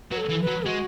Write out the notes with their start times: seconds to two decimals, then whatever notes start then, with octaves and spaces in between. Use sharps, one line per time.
0.11 F#3 B4
0.17 A4
0.30 E3
0.42 B4
0.47 F#3
0.66 G#3 F#4